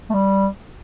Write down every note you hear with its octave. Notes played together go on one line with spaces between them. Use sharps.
A3
G3